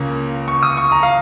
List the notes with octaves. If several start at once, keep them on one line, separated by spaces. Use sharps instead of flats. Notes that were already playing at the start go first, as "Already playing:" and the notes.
Already playing: C#2 C#3 A#3 C#4
C#6
D#6
C#6
A#5
F5